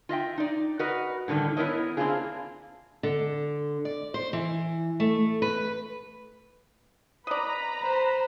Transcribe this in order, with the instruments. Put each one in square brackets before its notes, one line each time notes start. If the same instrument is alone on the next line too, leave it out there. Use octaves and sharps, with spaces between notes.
[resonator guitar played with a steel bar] F4 D#5 E5 G5
D#4 D5
F#4 A#4 B4 D#5
A2 D3 D#3 G3 A3
B3 E4 A#4 C#5 D#5
A#3 C4 D4 E4 F4 G#4
[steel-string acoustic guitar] D3
D5
C5
E3
A3
B4
[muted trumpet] B4 [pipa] D5 D#5 [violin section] A#5 B5
[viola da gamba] C5